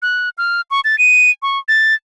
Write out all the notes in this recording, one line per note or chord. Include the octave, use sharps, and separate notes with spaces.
F#6
F6
C#6
A6
D#7
C#6
A6